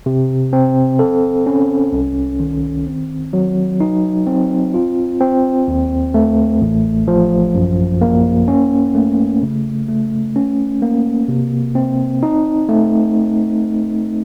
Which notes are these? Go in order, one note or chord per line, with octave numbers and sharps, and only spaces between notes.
C3
C4
A4
C#4
C2
D#3
C4
F#3
D#4
C4
F4
C4
D#2
A3
A1
F3
F#2
A#3
C#4
A3
C#3
A3
C#4
A#3
C3
C4
D#4
A3